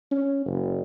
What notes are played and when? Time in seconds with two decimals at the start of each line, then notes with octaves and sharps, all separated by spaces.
0.11 C#4
0.46 F#1